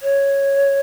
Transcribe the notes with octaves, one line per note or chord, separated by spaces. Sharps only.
C#5